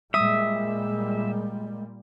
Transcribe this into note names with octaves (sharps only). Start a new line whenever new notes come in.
A#2 G3 G#3 E5 D#6